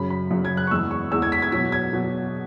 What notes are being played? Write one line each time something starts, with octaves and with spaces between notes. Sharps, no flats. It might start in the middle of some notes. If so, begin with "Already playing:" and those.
Already playing: F#2 C#3 F#3 B5
B5
F#2 C#3 F#3
G#6
F#6
C#6
E2 E3 G#3 E6
C#6
E2 E3 G#3 E6
G#6
B6
G#6
B2 F#3 B6
G#6
B2 F#3